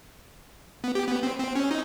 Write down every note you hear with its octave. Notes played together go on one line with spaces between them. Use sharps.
B3
G4
B3
C4
C4
C#4
D#4